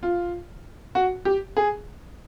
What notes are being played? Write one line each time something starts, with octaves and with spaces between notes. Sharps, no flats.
F4
F#4
G4
G#4